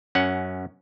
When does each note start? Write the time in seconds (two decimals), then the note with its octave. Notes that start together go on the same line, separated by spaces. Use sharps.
0.15 F#2 C#4 F#5